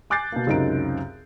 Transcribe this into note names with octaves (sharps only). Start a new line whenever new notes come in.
G#5 D6 F#6 G6 A6 C7
B2 A#3
C#2 F#2 C3 D#4 A#4 D7